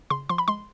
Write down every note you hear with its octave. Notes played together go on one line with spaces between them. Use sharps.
C#3 C6
F3 C6
B5
G#3 C6